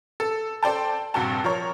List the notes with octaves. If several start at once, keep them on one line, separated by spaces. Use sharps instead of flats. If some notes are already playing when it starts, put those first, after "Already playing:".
A4
A4 C5 D5 G5 A5
A#1 G2 C3 F#4 G5 A5
F3 A#4 C#5